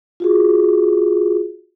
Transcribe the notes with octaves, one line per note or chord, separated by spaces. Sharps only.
F4 F#4 G#4